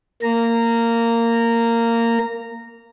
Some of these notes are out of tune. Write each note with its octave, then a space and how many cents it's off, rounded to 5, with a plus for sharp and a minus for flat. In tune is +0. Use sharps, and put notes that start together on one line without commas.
A#3 -15 A#5 -10